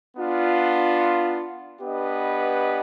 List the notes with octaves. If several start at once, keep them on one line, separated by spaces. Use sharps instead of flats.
B3 D4 F4
B3 D4 G4 B4 D#5